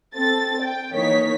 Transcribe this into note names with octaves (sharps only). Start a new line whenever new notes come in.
C4 A4 A6
G5
E3 A#3 D#4 C#5 B6